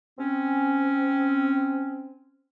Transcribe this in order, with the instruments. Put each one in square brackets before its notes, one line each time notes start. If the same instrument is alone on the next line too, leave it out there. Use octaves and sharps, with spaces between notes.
[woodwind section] C4 C#4